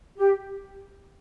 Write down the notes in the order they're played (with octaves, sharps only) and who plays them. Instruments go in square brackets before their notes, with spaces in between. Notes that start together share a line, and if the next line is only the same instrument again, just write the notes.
[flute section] G4